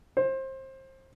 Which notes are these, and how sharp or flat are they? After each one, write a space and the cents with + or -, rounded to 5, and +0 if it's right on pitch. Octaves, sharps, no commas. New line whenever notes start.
C5 +25